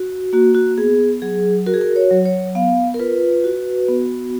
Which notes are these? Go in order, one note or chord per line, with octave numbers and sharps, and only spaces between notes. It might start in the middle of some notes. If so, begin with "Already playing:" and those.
Already playing: F#4
A#3 F#4
F#4
B3 G#4
F#3 G#4
F#4 A#4
G#4
A#4
C#5
F#3
C#5
B3 F5
A#4
F4 B4
F#4
B3